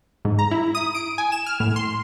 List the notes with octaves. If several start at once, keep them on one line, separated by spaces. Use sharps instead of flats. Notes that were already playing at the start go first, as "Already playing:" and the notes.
G#2
A#5
E4
D#6
D7
G#5
E7
F6
A2
C6